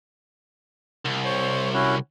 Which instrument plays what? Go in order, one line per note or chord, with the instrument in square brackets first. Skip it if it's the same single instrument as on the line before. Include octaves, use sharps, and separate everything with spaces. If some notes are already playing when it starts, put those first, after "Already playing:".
[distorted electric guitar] C2
[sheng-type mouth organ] C5 C#5
C#4 E4 F#4